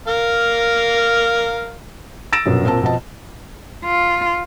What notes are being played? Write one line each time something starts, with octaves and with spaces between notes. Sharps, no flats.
A#4 F5
E6 A6 A#6 D7 E7
A#1 F#2 B2
A#2 C4 A#4 A5
F2 B2 D#5 A5
F4